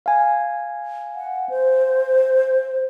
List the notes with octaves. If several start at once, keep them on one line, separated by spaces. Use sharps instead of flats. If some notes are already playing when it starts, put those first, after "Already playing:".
F5 G#5
F#5
C5